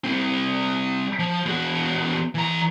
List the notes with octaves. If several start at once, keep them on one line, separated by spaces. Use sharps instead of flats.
G3 C4
F3
E2 F#4
E3 A#5